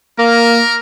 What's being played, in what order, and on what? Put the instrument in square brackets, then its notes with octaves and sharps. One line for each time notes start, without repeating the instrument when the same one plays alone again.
[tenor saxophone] A#3 [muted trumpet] A#4